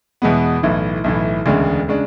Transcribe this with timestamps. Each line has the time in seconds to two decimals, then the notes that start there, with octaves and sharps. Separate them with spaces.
0.22 E2 B2 G#3 B3
0.63 B1 A2 E3
1.04 B1 A2 E3
1.46 E1 D2 C#3 G#3 D4
1.88 C#3 G#3 D4